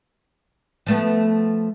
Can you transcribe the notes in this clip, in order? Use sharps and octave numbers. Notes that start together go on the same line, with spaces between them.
F3 A3 B3